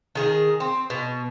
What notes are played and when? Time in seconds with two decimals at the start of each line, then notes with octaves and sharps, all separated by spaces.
0.15 D#3 G#4 A#4
0.60 C4
0.90 B2